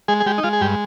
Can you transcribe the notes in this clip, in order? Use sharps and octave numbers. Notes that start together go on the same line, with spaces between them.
G#3 G#4
G#4
G#3 G4
D#4
G#3 F4
G#4
G2 G4